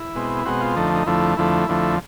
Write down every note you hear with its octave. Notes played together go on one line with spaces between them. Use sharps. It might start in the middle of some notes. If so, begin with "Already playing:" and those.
Already playing: E4
B2 G#3 C4
B2 G#3 C4 F#4
F4
F2 D3 F3 A3 D#4
D#4
F2 D3 F3 A3 E4
F2 D3 F3 A3 E4
F2 D3 F3 A3